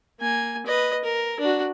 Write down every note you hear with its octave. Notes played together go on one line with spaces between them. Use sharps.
A#3 G#5
B4 D#5
A#4
D4 F#4